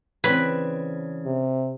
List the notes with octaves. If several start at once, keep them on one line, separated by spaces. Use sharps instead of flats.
C#3 E3 C4 D4 B4 B5 G#6
C3